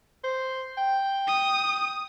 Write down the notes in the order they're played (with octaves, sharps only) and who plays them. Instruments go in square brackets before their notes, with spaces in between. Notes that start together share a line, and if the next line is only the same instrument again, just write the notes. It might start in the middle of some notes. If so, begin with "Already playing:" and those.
[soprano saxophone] C5
G5
[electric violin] D#6